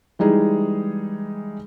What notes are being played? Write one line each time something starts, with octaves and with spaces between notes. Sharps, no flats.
E3 G3 G#3 D#4 G#4